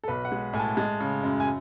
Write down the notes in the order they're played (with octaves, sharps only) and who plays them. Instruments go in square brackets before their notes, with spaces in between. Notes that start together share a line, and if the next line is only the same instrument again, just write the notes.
[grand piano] A4
B1 B4
F#5
G#3
A2 G#5
A5
G#3 A5
C#3
F#2
G#5